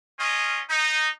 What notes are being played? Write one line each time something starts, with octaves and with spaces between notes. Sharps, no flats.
C#4 F4 D#5
D#4